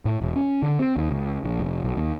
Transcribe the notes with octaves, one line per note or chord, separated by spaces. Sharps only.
A2
E1
C#4
D3
C4
D#2
C#2
A#1
F1
B1
D#2